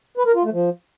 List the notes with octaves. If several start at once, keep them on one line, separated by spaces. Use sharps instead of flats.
B4
A#4
F4
A3
F3